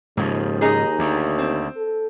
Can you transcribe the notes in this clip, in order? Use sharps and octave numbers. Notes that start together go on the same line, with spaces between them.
D#2 G#2 C#3 F3
D#4 G#4
D2
C4
A4